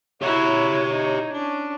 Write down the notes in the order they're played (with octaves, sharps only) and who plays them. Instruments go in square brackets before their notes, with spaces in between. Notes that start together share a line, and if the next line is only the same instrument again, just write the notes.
[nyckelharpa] E4 F#4 [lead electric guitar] G4 E5 [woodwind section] C#5
[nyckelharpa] D#4
C#4 D4